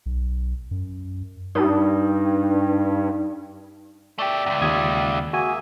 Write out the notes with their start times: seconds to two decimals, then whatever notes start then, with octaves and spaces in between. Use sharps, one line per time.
0.06 B1
0.71 F#2
1.55 G2 D#4
4.18 A3 G4 D5 E5
4.46 C#2 F#2
4.62 D#2 D#6 G#6
5.33 A#3 F#4 G#4 E5 G#5